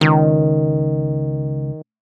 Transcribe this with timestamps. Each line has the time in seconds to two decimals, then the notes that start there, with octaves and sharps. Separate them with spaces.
0.01 C#2 D#3